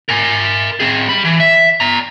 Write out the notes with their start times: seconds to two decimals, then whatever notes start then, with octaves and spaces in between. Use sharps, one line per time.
0.09 A#4 G#5
0.80 C4 G#4
1.09 G3 B5
1.25 E3
1.40 E5
1.80 D5 A#5